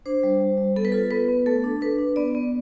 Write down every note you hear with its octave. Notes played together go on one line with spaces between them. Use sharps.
D4 C5
G3
G3
G3
B3 A4
B4
F4 A4
B3 B4
B3
A3 A4
D4
D4 B4
D4
B3 D5
B3